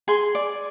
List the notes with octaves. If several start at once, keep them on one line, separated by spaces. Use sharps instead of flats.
G#4 G#5 C6
D5